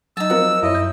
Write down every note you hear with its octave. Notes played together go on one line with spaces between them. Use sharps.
F#3 D#4 A5 E6
F3 C4 A#4 F#5
F#2 E4 C#5 D#5
G6